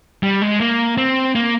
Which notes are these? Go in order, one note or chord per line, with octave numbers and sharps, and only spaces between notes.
G3
G#3
A#3
C4
A#3